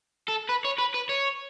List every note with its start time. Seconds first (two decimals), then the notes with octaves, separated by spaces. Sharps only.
0.29 A4
0.49 B4
0.65 C#5
0.79 B4
0.94 B4
1.09 C#5